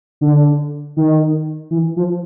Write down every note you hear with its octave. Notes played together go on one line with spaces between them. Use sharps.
D3
D#3
E3
F3